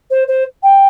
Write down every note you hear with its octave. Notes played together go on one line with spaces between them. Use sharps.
C5
C5
G5